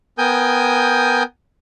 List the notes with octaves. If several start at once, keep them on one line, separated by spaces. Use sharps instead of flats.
B3 A#4 G5 G#5 D#6 G6